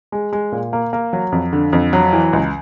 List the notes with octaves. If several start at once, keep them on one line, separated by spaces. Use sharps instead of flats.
G#3
G#3
A#2
A#3
A#3
F#3
F2
D3
F2
F#3
E3
C#2